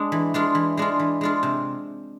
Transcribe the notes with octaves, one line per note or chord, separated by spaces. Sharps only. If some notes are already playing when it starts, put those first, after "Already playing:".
Already playing: G#3 D4
E3
G#3 D4 F4
E3
G#3 D4 F4
E3
G#3 D4 F4
C3